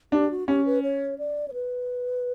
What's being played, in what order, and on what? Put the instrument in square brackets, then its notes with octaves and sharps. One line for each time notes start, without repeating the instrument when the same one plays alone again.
[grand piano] D4 [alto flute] G4
[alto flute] F#4
[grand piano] C#4 [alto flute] G4
[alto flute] B4
C#5
D5
C#5
B4